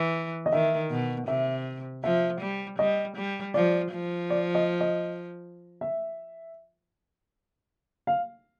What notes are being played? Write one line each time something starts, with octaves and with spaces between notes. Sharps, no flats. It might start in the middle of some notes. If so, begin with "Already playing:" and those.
Already playing: E3
D#5
D#3 E5
B2
C3 E5
F3 E5
G3
G3 D#5
G3
F3 D5
F3
D5
D#5
D#5
E5
F5